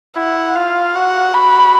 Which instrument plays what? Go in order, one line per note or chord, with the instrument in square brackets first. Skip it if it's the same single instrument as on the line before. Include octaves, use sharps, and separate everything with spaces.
[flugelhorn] E4 [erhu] F#5
[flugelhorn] F4 [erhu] F5
[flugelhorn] F#4 [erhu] F#5
[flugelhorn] F#4 [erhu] B5